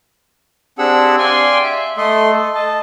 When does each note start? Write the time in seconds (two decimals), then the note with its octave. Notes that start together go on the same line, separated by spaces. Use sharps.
0.78 C4 D4 G4 G#4 F#5 E6
1.19 D5 F5 G5 G#5 C6
1.63 E5
1.97 A3 A4 D#5 C6
2.32 A4
2.55 D#5 A5